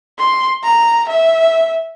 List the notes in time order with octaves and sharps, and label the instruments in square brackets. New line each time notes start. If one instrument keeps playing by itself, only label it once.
[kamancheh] C6
A#5
E5